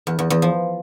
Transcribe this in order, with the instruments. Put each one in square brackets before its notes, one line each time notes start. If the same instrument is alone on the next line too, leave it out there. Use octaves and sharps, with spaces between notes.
[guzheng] E2
E2
E2
F3